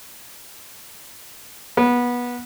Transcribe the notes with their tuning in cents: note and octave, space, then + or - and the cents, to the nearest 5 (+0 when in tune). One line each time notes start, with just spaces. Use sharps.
B3 -20